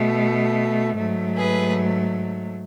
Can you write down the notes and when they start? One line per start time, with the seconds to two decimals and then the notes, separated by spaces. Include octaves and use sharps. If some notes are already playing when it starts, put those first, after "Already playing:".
Already playing: B2 A3
0.97 G#2 F#3 A3
1.36 G#4 B4